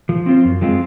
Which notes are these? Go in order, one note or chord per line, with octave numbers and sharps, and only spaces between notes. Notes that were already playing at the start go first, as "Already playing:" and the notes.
F3
C4 F4 C5
F#2
F3 G#3 C4 F4